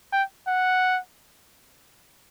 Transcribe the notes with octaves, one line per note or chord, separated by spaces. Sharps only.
G5
F#5